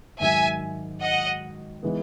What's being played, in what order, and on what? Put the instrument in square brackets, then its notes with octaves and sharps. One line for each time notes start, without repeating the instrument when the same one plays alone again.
[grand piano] G#2 D#3 F#3 [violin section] E5 G#5
[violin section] D#5 F#5
[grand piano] E3 G#3 B3 D#4